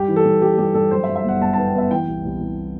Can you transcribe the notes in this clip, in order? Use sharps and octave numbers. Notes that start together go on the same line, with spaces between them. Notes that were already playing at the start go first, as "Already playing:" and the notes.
Already playing: G2 G4
E3
A4
G2
G3 G4
G2 G4
G2 A4
F#2 C5
E5
F#2
E5
G1 F#5
G1 A5
B3 A5
G5
B3 E5
E3 G5
C2
C2
C2